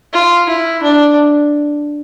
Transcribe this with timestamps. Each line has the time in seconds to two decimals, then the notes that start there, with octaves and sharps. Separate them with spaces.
0.13 F4
0.49 E4
0.83 D4